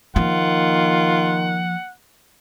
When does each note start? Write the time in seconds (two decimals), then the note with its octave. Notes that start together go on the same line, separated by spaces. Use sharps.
0.16 D#3 F3 A#3 F4 F#5